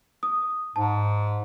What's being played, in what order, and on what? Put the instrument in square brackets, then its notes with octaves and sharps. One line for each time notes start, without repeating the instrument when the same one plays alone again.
[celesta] D#6
[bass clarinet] G#2 [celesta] A5